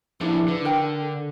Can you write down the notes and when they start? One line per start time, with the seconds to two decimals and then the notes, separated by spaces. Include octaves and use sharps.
0.21 F3 D4 E4 G#4
0.48 D3 B4
0.65 D4 A#4 G5
1.01 A4